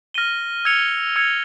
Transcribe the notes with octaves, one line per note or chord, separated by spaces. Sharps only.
F6 A#6 D#7 G7
E6 G#6 C#7 F7
E6 G#6 C#7 F7